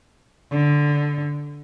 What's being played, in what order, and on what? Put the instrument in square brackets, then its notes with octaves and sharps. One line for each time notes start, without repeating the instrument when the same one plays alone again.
[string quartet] D3